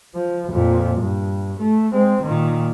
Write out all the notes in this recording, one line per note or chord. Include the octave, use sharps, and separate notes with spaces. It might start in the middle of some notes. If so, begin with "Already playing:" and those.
F3
F2 A#2
G2
A3
G#3 C4
A#2 D#3